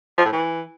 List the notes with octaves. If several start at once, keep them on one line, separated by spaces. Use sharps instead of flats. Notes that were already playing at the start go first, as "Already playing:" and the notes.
F3
A2
E3